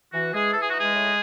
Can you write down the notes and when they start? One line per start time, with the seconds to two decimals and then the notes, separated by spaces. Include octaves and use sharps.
0.13 E3 F#4
0.33 E3 G#3 G#4
0.53 E3 A4
0.62 G#4
0.70 F#4
0.74 G#3 D#4 G#4
0.93 A2